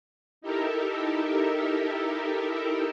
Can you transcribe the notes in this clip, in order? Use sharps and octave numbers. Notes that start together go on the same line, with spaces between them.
D#4 E4 G4 A4 A#4 E5